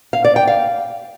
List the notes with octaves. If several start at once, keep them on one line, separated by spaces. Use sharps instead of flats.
F5
D5
G5
F5